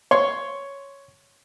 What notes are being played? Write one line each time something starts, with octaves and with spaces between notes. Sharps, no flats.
C#5 C6